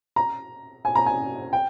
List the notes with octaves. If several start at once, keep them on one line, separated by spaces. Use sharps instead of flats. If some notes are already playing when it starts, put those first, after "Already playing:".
A#5
G#5
A#5
G#5
G5